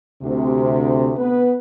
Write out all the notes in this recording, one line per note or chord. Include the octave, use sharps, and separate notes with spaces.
D2 C3
B3 B4